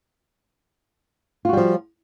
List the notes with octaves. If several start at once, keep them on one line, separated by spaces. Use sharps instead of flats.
F3 G3 F4 F#4